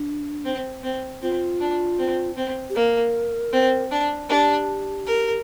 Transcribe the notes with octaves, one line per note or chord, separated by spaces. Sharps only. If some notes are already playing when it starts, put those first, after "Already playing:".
Already playing: D4
C4
C4
C4 F4
D4
C4
C4
G4
A#3 A#4
C4
D4
D4 G4
A#4